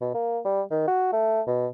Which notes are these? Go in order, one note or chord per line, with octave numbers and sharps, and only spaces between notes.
B2
A#3
G3
D#3
F#4
A3
B2